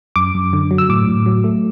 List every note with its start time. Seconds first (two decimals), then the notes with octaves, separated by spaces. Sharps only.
0.16 F#2 D6
0.35 F#2
0.53 D3
0.71 F#3
0.78 E6
0.89 A2 D6
1.07 A2
1.26 F#3
1.44 A3